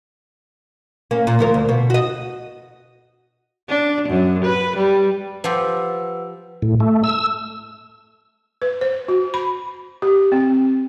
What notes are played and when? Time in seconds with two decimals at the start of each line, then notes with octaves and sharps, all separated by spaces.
1.11 A#3 C#4
1.27 A#2
1.39 D2 F3 A#4
1.54 D2
1.69 B2
1.90 F#4 D#5
3.69 D4
4.09 F#2
4.45 B4
4.76 G3
5.44 F3 G4 B4 F#5 E6
6.62 A2
6.80 A3
7.04 E6
8.62 B4
8.81 C5
9.08 F#4
9.34 B5
10.02 G4
10.32 C4